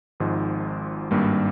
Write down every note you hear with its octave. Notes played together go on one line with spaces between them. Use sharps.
G#1 G#2 F3 G#3
G#1 G2 G3 A#3